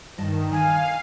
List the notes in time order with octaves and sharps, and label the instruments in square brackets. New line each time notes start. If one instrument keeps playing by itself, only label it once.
[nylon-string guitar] G2 D#5 A5 [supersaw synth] D#3
[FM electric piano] D#3 [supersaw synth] F5 [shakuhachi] G#5